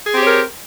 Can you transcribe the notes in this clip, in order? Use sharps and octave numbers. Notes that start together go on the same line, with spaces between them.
C4 G4 G#4 A#4 C#5